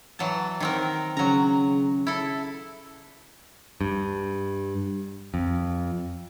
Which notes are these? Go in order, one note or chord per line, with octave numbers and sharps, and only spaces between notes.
E3 F#3 A5
D#3 C4 A#4
C#3 F#3 A#5
E4 A4
G2
F2